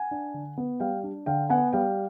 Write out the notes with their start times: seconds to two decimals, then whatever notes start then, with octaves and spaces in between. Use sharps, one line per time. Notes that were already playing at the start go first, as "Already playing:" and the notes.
Already playing: F#5 G#5
0.11 D4
0.34 D3
0.58 B3
0.80 G3 F5 G5
1.03 D4
1.26 D3 F5 G5
1.49 B3 F#5 G#5
1.73 G3 F5 G5